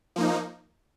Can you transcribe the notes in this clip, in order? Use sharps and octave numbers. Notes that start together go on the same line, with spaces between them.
F3 A#3 D#4